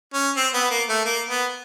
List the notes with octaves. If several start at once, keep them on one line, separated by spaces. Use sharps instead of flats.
C#4
C4
B3
A#3
A3
A#3
B3